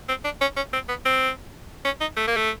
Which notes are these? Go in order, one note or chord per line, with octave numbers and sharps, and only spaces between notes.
C4
D4
C#4
C#4
C4
B3
C4
C#4
D#4
A3
A#3
A3